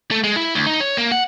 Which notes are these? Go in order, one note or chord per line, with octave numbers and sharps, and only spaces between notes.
A3
G#3
E4
D2
D#4
C#5
A#3
F#5